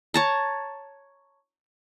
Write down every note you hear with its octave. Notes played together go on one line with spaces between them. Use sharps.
C#5 A5 A#5